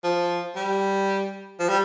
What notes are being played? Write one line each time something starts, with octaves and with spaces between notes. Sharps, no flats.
F3
G3
F3
G3